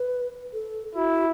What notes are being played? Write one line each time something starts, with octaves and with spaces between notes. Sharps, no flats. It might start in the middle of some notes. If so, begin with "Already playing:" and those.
Already playing: B4
A4
E4 F#4